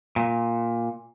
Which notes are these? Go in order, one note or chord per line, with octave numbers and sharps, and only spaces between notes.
A#2